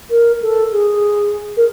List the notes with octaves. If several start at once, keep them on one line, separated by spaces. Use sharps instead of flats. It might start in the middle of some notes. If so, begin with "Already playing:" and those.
A#4
A4
G#4
A#4